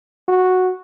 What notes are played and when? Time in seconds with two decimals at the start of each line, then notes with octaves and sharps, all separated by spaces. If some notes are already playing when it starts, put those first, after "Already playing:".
0.28 F#4